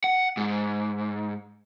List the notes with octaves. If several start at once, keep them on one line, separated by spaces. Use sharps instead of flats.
F#5
G#2